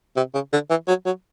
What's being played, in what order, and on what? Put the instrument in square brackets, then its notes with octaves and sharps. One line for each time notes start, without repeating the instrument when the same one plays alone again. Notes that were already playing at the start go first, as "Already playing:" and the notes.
[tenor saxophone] C3
C#3
D3
E3
F#3
F#3